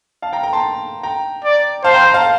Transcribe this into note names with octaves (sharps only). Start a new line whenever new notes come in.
F5 A5
G5 A#5
G5 A#5
A5 C6
G5 A#5
D5
C5 F5 A5
G5 A#5
G5 A#5
F5 A5